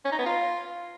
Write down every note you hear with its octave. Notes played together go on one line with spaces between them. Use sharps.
C#4
D#4
B3
F4